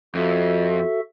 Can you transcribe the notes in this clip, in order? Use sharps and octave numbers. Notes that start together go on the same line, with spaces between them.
F2 F#4 A4 E5